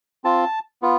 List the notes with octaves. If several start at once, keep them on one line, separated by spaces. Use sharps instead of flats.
C4 F4 A5
B3 F4